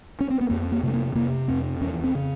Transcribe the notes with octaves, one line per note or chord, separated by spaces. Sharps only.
C#4
C4
B3
F2 A#3
A#3
C3 A3
A#3
C3 A#3
F2 C4
E2 C#4
C4
C#3